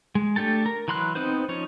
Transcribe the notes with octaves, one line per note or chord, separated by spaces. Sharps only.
G#3
A3 D4 G4 A4 A5
A#4
E3 F#3 B5 C6 F#6
B3 C4 D#4 B4 C5
F3 C#4 D#4 C#5